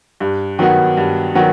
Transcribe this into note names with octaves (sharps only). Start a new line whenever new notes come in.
G2
D#3 F#3 B3 F#4
G2
D#3 F#3 B3 F#4